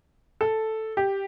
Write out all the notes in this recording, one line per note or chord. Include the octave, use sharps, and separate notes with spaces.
A4
G4